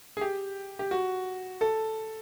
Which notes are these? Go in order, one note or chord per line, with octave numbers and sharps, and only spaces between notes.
G#4
G4
G4
F#4
A4